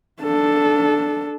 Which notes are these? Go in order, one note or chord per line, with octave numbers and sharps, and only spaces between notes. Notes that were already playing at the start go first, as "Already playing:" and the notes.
D4 A4